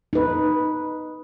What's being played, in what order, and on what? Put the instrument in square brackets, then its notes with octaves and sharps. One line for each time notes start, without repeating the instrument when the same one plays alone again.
[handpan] D#4 B4